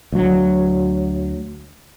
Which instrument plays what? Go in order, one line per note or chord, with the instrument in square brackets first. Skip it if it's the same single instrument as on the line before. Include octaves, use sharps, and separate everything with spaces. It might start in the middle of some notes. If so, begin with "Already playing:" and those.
[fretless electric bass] D2 F#3